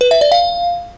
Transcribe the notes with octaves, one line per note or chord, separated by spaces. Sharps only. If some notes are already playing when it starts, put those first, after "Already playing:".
B4
E5
D5
F5